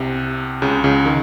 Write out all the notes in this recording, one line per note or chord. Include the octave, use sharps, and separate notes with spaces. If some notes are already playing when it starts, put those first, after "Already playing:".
Already playing: C2 C3
C#2 C#3
C#2 C#3
D#3